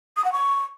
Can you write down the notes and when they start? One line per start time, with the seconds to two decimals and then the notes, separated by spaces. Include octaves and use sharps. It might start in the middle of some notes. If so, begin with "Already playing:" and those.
0.17 D#6
0.25 F#5
0.32 C#6